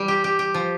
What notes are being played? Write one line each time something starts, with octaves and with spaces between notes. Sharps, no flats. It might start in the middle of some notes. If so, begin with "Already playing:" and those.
Already playing: E3 G3
G4
G4
G4
F3